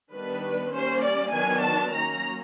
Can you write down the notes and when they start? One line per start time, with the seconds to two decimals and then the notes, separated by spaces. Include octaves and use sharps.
0.11 D#3 G3 B3 D4 B4
0.72 G3 A#3 C#4 C5
1.02 D5
1.32 D#3 F#3 B3 D4 G#5
1.62 A5
1.92 F#3 A#3 C#4 A#5